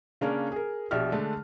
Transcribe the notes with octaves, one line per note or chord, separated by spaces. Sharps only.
C#3 A#3 C#4 D4 A#4
G#4 A#4
A#1 B2 G4 E5 F6
D3 G#3 A3 D4